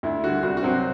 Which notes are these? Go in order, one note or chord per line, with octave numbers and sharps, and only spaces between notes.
D2 E4
D3 G3 F#4
C2 F#4
F#4
C3 F#3 C4